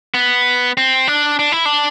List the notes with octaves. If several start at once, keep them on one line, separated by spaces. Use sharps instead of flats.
B3
C4
D4
D4
E4
D4